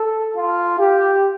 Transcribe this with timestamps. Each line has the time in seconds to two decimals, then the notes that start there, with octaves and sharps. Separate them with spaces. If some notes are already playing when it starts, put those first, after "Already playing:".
Already playing: A4
0.36 F4
0.79 G4